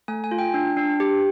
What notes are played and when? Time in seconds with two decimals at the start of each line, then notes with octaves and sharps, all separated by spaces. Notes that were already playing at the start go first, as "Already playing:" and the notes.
0.08 A3 G#5
0.24 G#5
0.31 F4
0.39 G5
0.54 D4
0.77 D4
1.00 G4